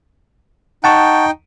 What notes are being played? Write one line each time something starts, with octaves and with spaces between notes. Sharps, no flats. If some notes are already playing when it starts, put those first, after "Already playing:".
D#4 F#5 G5 A5 C#6